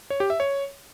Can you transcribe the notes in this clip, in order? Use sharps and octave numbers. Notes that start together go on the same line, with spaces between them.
C#5
G4
E5
C#5